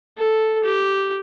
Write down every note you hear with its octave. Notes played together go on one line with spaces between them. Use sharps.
A4
G4